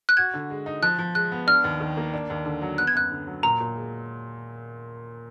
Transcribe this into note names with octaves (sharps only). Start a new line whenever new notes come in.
F#6
F#4 G#6
D3
G#3
D#4
F3 F#6
F3
G#3 F#6
B3
D4 F6
D#2
D#3
A#3
D4
D#2
D3
F#3
B3 F#6
G#6
F#2 F#6
D3
F#3
A#2 A#5
A#2
G#3